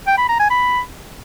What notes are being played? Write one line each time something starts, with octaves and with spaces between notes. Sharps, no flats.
G5
B5
A#5
G#5
B5